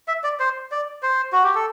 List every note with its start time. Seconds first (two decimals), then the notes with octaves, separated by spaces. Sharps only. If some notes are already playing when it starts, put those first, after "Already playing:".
0.08 E5
0.24 D5
0.40 C5
0.72 D5
1.03 C5
1.32 F#4
1.44 G4
1.55 A4